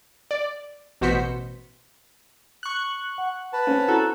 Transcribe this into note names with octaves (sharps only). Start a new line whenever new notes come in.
D5
A1 B2 F#4 C5 B6 C#7
C#6 F#6
F#5
B4 A5
C4 C#4
E4 F#4 A4 A#5 F#6